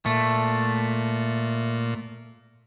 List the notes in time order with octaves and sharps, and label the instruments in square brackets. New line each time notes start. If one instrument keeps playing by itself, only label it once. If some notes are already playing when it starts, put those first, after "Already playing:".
[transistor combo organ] A#2 [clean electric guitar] A3